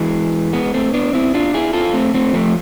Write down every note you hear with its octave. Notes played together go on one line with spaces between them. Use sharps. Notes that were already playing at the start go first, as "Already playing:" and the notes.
Already playing: E3 G#3
G#3 B3
A3 C4
B3 D4
C4 E4
D4 F4
E4 G#4
F4 A4
A3 C4
A3 C4
F3 A3